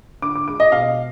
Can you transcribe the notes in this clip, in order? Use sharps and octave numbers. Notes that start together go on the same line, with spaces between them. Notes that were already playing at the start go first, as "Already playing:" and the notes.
D3 D6
D6
G#3 D6
D#5
B2 F5